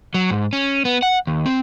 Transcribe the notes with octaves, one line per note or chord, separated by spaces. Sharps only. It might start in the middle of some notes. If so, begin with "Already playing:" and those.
F#3
G#2
C#4
B3
F#5
D#2
C4